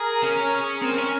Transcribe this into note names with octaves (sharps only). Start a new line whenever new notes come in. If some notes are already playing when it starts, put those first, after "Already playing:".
Already playing: G#4 A#4
C#4
G#4
C4 A#4
C#4